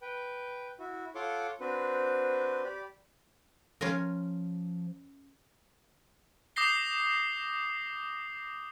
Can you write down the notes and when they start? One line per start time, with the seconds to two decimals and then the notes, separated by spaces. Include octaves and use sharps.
0.02 B4 G5
0.79 E4 F#4
1.15 F4 A4 C#5 F#5 C6 D6
1.60 C4 D4 F#4 B4 C5
2.64 G4 D5 B5
3.81 F3 C#4 F4 A#4
6.56 D6 D#6 G6 A#6 C7 G7